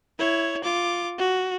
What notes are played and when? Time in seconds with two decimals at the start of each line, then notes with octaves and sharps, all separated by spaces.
0.19 E4 C#5
0.64 F4 D6
1.18 F#4